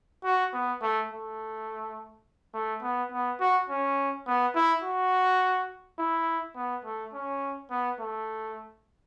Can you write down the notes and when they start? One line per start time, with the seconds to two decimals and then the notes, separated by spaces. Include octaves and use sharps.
0.24 F#4
0.53 B3
0.82 A3
1.11 A3
2.54 A3
2.83 B3
3.12 B3
3.40 F#4
3.69 C#4
4.26 B3
4.55 E4
4.84 F#4
5.99 E4
6.56 B3
6.85 A3
7.14 C#4
7.71 B3
8.00 A3